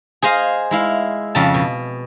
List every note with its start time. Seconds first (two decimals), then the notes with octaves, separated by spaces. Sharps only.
0.22 G#4 C5 D#5 F5
0.71 G#3 E4 F5
1.35 F2 C#3 A5
1.54 B2